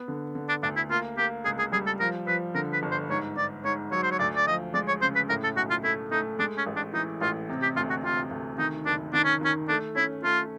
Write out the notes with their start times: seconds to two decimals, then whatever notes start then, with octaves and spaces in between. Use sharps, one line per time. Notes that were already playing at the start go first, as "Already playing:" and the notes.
Already playing: B3
0.08 D3
0.35 D3
0.49 D4
0.63 D2 D4
0.76 E4
0.90 A#3 F4
1.17 A#3 G4
1.45 C#2 G#4
1.59 G#4
1.72 G3 G#4
1.86 A4
2.00 F3 A#4
2.27 F3 B4
2.54 D3 A#4
2.73 B4
2.83 G1
2.91 C5
3.10 G#2 C#5
3.37 G#2 D5
3.65 G#2 C#5
3.92 F#3 C#5
4.03 C5
4.11 C#5
4.19 D2 D5
4.36 D5
4.47 F3 D#5
4.74 G#3 D5
4.88 C#5
5.02 C#3 C5
5.15 B4
5.29 A2 A#4
5.44 A4
5.56 B1 F#4
5.70 F4
5.84 A3 E4
6.12 A3 D#4
6.39 G#3 D4
6.57 C#4
6.67 A1
6.76 D4
6.93 E3 D#4
7.21 A1 F4
7.49 C3
7.62 G4
7.76 D2 F4
7.90 F#4
8.04 C3 F4
8.31 D2
8.58 D#3 D#4
8.86 F#1 D4
9.13 D#3 D4
9.24 C#4
9.41 D#3 C#4
9.68 A3 D4
9.96 C#4 E4
10.23 A3 F4